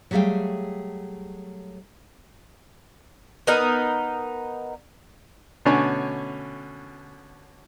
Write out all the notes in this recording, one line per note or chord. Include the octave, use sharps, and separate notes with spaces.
F#3 G3 A3 G#4 F5 G5
B3 D#4 A#4
B2 D3 A3 C#4 C#5 G#5